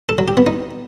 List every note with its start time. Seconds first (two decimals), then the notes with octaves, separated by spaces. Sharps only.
0.09 A4
0.18 F#3
0.28 G4
0.37 B3
0.47 D#4